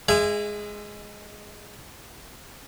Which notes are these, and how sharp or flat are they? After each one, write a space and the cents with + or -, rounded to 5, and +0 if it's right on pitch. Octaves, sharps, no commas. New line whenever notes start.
G#3 +0 E5 +35 G#5 -20